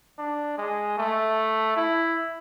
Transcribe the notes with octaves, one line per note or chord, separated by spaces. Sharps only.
D4
G#3
A3
E4